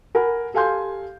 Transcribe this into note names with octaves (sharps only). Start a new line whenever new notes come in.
A#4 F#5 G#5 B5
G4 A4 F5 G#5 C6 G6